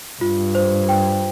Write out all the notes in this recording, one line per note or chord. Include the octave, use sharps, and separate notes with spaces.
G2 F4
C5
G5